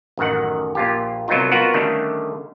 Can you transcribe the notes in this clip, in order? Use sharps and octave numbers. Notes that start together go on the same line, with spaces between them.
A1 F#2 D#3 F#5
A#1 F4 G4
C2 F#3 B3 D#4 F4
B3 F4 F#4 A#4 F#5
D3 D#3 G3 A3 C#4